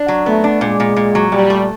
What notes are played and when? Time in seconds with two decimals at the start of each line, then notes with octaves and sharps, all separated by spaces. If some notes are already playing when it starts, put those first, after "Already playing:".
Already playing: D4
0.08 F#3
0.26 A3 B3
0.44 D4
0.61 A#2 G#3
0.80 A#2
0.96 A#2
1.15 F#3
1.32 A#2 G3
1.50 A3